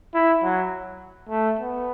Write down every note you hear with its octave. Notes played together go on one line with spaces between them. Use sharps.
E4
F#3
A3
B3